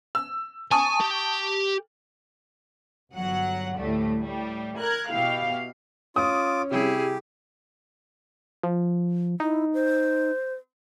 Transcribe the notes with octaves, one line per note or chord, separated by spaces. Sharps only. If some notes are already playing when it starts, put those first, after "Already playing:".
E6
G#5 A5 C#6 D#6
G4
G1 F#3 F#5
D2 A2 G3 A3
A2 G3
A#4 F#6 G#6
B2 E4 G4 F5
C#4 F4 D6 D#6
C3 G3 E4 G4 G#4
F3
D#4 E4
C5